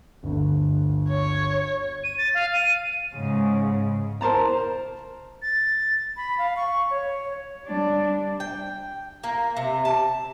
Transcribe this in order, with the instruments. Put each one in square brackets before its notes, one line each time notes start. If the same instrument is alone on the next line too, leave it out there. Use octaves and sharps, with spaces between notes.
[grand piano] G1 D2
[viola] C#5
[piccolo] D#7
A6
F5
D#7
[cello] G#2 C#3
[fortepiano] A#4 C5 A5 A#5
[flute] A6
B5
F5
C#6
C#5
[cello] G3 D4
[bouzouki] G5
A#3
C3
A5